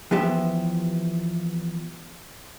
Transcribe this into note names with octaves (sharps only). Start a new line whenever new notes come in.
E3 F3 B3 G4 E5